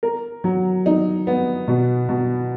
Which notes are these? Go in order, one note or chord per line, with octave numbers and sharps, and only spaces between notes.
A#4
F#3
D#4
B3
B2
B2